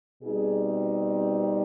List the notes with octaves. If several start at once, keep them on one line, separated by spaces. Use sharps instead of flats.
B2 G3 C4 D#4 G#4